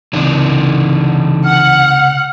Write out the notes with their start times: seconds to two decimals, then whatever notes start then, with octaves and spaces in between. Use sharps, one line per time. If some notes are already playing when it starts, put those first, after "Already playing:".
0.13 C#2 C3 E3 D4 D#4
1.45 F#5 F6